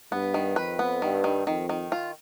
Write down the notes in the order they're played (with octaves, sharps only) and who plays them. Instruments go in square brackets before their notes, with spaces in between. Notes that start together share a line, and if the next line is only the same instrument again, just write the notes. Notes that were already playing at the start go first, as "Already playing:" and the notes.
[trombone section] G2 [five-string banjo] B3
[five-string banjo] D#3
[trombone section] F2 [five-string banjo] B4
[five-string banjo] B3
[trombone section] G2 [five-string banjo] D#3
[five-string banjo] D#3
[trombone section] F2 [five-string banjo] D#3
[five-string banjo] D#3
F4